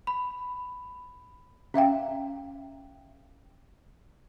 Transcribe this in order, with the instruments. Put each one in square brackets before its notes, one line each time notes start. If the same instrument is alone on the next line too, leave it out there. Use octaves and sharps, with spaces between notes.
[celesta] B5
[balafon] C#4 E5 F5 G5